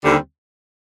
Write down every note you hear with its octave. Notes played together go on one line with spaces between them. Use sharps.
D#2 D3 G3 C4